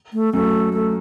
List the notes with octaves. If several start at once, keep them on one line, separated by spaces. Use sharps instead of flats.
A3
F#2 A3
A3